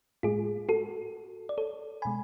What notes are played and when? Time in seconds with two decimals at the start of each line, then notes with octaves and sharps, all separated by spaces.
0.23 A2 G#3 F4 G#4
0.69 F#4 A4
1.49 D5
1.58 A4 C#5
2.02 B2 G#3 G#5 B5